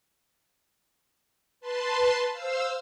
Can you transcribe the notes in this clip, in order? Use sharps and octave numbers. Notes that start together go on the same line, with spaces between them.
B4 A5 C6
C5 F5 E6